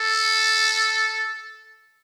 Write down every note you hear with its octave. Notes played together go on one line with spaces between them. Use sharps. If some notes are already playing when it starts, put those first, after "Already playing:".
Already playing: A4